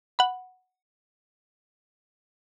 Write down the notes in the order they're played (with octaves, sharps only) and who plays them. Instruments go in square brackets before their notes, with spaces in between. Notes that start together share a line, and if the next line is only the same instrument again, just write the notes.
[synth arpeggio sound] F#5 B5